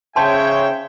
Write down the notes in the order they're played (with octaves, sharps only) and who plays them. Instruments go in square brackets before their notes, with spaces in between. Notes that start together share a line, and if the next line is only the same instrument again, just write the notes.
[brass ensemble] C#3 G5 [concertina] C5 C#5 C#6 [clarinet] E5 [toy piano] A5 C6